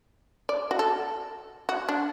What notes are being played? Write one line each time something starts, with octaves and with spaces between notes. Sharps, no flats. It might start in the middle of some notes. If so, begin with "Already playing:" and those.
D5
F#4
A4
F#4
D4